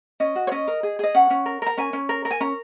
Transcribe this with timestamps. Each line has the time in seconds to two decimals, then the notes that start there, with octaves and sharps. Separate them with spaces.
0.20 C#4 D#5
0.35 F#4
0.47 C#5
0.51 C#4 D#5
0.67 A#4
0.83 G#4
0.99 G#4 D#5
1.14 C#4 F#5
1.30 C#4
1.46 A#4
1.62 A#4 A#5
1.77 C#4 G#5
1.93 C#4
2.09 A#4
2.25 A#4
2.31 G#5
2.40 C#4 A#5